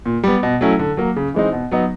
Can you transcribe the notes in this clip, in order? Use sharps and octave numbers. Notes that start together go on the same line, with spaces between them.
A#2
G3 B3
B2
F#3 A3 C#4 E4
D3
F#3 A#3
C#3
E3 G#3 C4 D#4
B2
F#3 B3 D#4